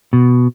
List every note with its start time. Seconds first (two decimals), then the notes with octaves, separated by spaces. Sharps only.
0.13 B2